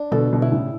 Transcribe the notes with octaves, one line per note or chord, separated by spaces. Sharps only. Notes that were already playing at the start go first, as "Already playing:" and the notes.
Already playing: D4
B2 D3 A4
B2 D3
D3 E4
A2 C#3